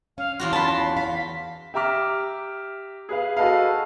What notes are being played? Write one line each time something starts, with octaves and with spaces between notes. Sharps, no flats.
C#4 F5
E2 F4 F#4 C6
C#4 A5 B5
F5 B6
G4 E5 A#5 D6 F6
G#4 B4 F5
F#4 G#4 A4 B4 D#5 F5